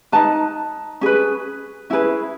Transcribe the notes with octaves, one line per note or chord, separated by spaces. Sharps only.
D#4 G#4 B4 A5
C#4 G#4 B4
C#4 E4 G#4 B4